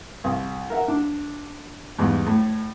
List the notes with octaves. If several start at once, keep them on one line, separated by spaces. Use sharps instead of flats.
C2
A#4 E5 F#5
D4
E2 G#2 G3
A2